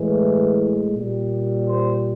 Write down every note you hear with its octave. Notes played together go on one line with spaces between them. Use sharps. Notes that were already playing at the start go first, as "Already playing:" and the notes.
Already playing: A2 E3 G#3
A#2 G3
C5